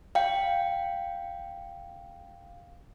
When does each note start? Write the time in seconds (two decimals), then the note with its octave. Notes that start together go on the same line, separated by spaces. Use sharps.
0.15 F5 G5